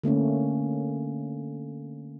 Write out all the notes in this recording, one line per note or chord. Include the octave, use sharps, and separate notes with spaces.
D3 A3 A#3 C#4